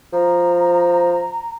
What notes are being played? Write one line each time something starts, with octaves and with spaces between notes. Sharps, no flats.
F3 A#5